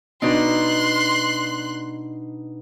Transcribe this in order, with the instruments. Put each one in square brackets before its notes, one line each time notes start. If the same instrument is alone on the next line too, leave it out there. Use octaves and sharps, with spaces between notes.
[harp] B2 D4 D#4 [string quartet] C6 F#6